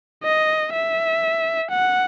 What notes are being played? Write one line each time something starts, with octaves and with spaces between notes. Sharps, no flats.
D#5
E5
F#5